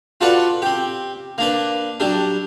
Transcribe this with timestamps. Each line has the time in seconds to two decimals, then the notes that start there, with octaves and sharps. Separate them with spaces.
0.21 F4 F#4 A4 B4 D5 F#5
0.62 C4 G4
1.38 A#3 D4 B4
2.00 F#3 G3 D4